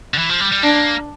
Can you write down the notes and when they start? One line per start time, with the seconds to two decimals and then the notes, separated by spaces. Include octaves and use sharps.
0.14 D3
0.18 E3
0.29 F3
0.40 G3
0.52 G3
0.63 A#3 D4